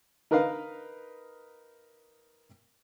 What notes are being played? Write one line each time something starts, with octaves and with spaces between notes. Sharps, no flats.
D#4 A#4 B4 D#5 F5